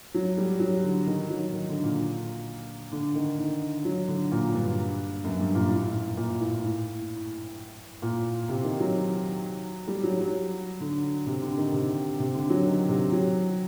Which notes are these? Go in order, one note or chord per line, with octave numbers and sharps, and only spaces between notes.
F#3
G3
F#3
D3
D#3
F#3
D#3
D3
A#2
D3
D#3
D#3
F#3
D3
A#2
G2
F#2
G2
A#2
A2
A2
A#2
A2
A2
A#2
C3
D#3
F#3
G3
F#3
F#3
D3
C3
D3
D#3
C3
C3
D3
F#3
D#3
C3
F#3